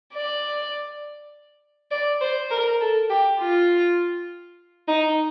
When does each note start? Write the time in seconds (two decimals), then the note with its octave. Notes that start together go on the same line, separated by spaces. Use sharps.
0.15 D5
1.91 D5
2.21 C5
2.51 A#4
2.81 A4
3.10 G4
3.40 F4
4.88 D#4